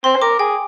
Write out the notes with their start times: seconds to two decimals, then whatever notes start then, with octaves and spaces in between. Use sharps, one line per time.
0.04 C4 C6
0.16 C5
0.22 A#4 D6
0.39 G#4 G5